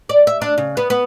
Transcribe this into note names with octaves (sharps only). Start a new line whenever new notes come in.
D5
E5
D4
C#3
B3
B3